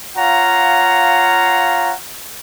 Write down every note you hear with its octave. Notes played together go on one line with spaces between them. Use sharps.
F4 C#5 F5 F#5 A#5